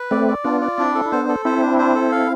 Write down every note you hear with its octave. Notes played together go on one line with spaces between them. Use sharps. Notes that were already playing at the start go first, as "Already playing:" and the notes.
Already playing: B4
A3 C4 D5
D5
B3 D4 F4
D5
C4 D4 E4
A4
E4
B3 D4 C5
A4
C4 E4 C5
D4
C5
A4
F5